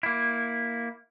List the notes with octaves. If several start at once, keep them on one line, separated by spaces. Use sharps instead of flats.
A#3 E4